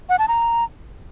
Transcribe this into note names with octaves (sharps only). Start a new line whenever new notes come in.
F#5
A5
A#5